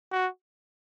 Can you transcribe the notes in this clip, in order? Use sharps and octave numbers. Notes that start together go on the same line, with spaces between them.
F#4